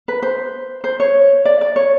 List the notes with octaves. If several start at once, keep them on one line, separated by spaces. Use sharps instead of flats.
B4
C5
C5
C#5
D5
D5
C#5